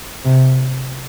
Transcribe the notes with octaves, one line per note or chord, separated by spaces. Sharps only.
C3